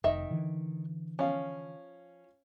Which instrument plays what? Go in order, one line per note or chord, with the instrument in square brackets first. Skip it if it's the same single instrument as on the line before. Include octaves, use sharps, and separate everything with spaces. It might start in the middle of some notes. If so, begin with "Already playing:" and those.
[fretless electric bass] F1 [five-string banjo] D#3 D#5 E5
[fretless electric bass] D3 E3
[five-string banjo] F3 [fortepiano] C#4 F5